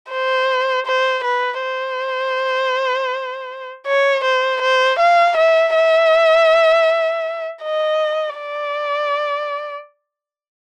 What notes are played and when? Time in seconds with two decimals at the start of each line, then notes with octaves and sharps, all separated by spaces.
0.12 C5
0.87 C5
1.24 B4
1.62 C5
3.87 C#5
4.24 C5
4.62 C5
4.99 F5
5.37 E5
5.75 E5
7.63 D#5
8.38 D5